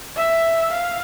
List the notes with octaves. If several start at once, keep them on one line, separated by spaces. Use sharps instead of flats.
E5
F5